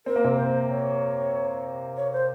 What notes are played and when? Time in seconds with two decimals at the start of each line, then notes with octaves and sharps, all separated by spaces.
0.06 C4 A#4
0.16 A#3
0.24 C3 C4
0.37 C5
0.69 C#5
1.97 C#5
2.13 C5